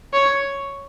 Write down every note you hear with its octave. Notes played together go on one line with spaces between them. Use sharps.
C#5